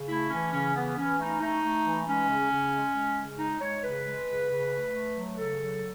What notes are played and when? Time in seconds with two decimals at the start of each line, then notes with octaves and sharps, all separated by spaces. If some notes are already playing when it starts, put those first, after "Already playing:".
Already playing: C#3
0.09 A3 E4
0.30 E3 C#4
0.52 C#3 C#4
0.74 E3 B3
0.97 E3 C#4
1.19 A3 D#4
1.40 A3 D#4
1.63 A3
1.85 E3
2.06 G#3 C#4
2.28 C#3
2.50 C#3
2.72 G#3
2.95 G#3
3.17 C#3
3.39 G#3 D#4
3.60 G#3 C#5
3.83 C#3 B4
4.06 G#3
4.27 C#3
4.49 C#3
4.71 A3
4.93 A3
5.15 F#3
5.38 C#3 A4
5.59 F#3